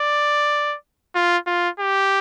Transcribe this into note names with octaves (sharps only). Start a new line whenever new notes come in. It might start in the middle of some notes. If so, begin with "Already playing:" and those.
Already playing: D5
F4
F4
G4